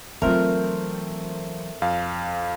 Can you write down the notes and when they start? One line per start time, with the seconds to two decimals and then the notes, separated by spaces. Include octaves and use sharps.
0.22 E3 F#3 A3 C4 F4 A#4
1.82 F2 F5